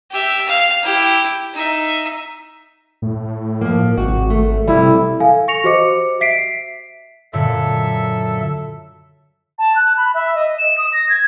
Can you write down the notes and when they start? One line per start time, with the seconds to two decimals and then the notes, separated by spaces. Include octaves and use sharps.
0.12 G4 E5
0.48 F5
0.83 E4 G4
1.54 D#4 E5
3.02 A2
3.61 F3 A#3
3.97 G#1 C3 F#4
4.30 A3
4.67 C3 G3 E4
5.20 A4 F5 G#5
5.48 C#6 A#6 C#7 F7
5.64 F#4 G4 C5 D#5 D6 C#7
6.21 E5 B6 C7 D7
7.33 F#2 A#2 D3 A4 E5
9.59 A5
9.76 F#6
9.97 B5
10.14 E5
10.35 D#5
10.58 E7
10.78 D#6
10.93 A#6
11.09 G#6